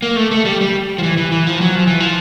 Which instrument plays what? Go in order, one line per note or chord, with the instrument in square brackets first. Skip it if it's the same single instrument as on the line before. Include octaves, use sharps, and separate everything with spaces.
[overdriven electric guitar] A#3
A3
A3
G3
G3
F3
E3
E3
E3
F3
F#3
F3
E3
F3